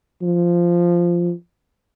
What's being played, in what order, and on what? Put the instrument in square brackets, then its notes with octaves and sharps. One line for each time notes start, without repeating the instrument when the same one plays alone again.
[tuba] F3